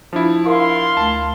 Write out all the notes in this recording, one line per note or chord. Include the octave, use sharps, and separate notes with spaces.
F3 D4 E4
A#4 F5 C6
D2 A3 A5